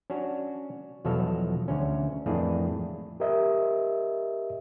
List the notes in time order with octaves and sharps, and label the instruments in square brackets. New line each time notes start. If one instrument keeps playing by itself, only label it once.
[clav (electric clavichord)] C#4 D4 F#4
E2 B2 F3 F#3 A4 F5
D2 C#4
F2 A2 E3 A#3 D4 G#4
[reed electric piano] G4 A#4 C5 D#5 E5